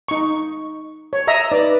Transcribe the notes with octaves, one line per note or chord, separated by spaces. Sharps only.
D#4 C#6
C#5
D#5 E5 A#5
D#4 B4 D5